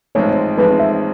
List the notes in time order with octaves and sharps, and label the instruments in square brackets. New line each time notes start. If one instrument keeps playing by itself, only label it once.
[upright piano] A1 G#2 F3 G#3 C4 [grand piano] C#5
[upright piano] A1 G#2 F3 G#3 C4 [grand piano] B4
[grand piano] E5